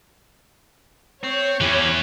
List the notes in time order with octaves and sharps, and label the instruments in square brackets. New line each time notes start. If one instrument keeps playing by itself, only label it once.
[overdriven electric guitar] C4 [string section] C#5
[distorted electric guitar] E2 E3 [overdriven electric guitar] C#4 G4